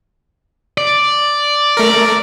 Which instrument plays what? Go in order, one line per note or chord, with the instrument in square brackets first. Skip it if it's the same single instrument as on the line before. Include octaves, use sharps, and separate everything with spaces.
[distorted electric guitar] D5
[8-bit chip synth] A3 A#4